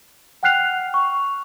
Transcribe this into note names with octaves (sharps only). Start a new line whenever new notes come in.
F#5 G5 F6 F#6 C7 F7
C#6